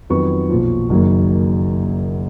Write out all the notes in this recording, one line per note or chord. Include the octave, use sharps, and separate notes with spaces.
F2 D#3 F#3 B3 C#6
B1 A#2 F3
F#1 F#2 D#3 F#3 A#3